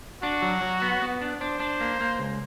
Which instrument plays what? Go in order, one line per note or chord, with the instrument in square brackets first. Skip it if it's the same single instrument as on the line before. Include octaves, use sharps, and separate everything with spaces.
[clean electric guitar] D4 [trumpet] F#4
[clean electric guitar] F#3
F#3
B3
B3
D4
[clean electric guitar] D4 [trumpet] C5
[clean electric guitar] D4
A#3
A#3
C#2